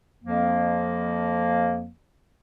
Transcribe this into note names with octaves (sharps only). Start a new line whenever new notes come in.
F2 F3 A#3